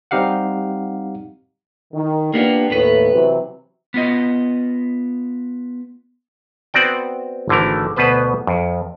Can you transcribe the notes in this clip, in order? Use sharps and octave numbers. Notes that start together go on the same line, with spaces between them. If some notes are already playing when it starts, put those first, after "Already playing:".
G3 C4 D#4 G4 F5 F#5
D#3
A#3 B3 D4 F4 G4
D#2 A2 B3 B4
C3 E3 F#3
B3 F4 D#5
B3 C4 F#4 D5 G5
G#1 D3 E3 A3 A#4
D2 B2 B3 B4 C5
F2